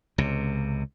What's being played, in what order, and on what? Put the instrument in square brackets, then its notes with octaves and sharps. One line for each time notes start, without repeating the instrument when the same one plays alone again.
[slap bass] C#2 C3